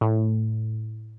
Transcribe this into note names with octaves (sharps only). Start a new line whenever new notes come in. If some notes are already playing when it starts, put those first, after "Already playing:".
A2